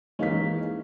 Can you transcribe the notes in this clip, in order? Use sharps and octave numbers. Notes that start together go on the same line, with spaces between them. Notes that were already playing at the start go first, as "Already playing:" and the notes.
E3 G#3 A#3 C#4 D#4 G#4 F5 B6